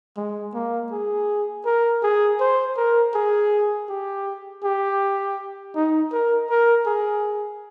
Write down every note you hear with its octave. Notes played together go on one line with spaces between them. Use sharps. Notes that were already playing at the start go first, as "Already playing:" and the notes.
G#3
A#3
G#4
A#4
G#4
C5
A#4
G#4
G4
G4
D#4
A#4
A#4
G#4